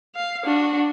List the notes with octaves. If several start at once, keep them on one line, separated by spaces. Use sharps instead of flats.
F5
D4 F#4